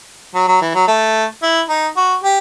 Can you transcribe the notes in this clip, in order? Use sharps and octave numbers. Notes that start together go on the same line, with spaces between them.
F#3
F#3
E3
F#3
A3
E4
D#4
F#4
G4